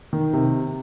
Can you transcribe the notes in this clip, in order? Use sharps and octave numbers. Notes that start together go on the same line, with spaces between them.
D#3
C3